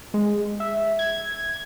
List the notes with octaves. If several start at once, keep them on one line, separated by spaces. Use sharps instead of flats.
G#3
E5
G#6